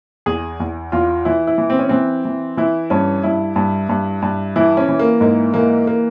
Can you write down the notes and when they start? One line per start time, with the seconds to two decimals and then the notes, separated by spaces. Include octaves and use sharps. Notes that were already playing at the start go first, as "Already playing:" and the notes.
0.26 E2 G#4
0.60 E2
0.92 E2 F4
1.25 E3 E4
1.47 E4
1.58 E3
1.70 C4
1.79 C#4
1.89 E3 C4
2.25 E3
2.57 E3 E4
2.90 G2 C#4
3.23 G2 E4
3.56 G2
3.89 G2
4.22 G2
4.56 E3 E4
4.77 C#4
4.89 E3
4.99 A#3
5.21 G#2 A#3
5.54 E3 A#3
5.87 A#3